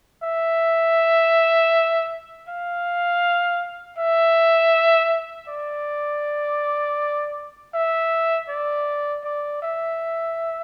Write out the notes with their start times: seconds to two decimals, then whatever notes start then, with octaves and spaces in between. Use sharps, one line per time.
0.23 E5
2.49 F5
3.98 E5
5.48 D5
7.74 E5
8.49 D5
9.24 D5
9.62 E5